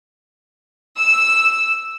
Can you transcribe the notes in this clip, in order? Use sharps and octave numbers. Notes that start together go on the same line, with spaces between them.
E6